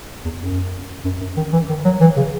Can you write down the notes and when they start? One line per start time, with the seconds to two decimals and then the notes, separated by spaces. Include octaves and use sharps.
0.25 E2
0.41 F#2
1.04 F#2
1.21 F#2
1.37 D#3
1.53 E3
1.69 D#3
1.85 F#3
2.01 E3
2.16 C#3